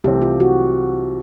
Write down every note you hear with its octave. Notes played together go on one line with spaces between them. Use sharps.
C2 C3 E3 A3 C4 G4
F4
F#4